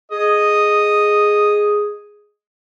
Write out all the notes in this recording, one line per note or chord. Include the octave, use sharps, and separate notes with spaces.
G#4 D#5